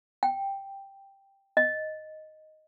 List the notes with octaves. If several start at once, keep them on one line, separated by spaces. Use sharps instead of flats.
G5
D#5